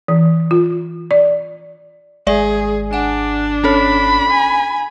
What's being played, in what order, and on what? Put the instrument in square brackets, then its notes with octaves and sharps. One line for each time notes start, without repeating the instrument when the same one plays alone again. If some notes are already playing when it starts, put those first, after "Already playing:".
[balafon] E3
F4
D5
[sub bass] G#1 [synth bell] G#3 D5 [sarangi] G#4
[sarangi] D4 [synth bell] F#5 G#5
[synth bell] C#4 A4 C#5 [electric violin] B5
[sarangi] G#5